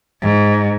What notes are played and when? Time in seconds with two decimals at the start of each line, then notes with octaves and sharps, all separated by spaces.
0.22 G#2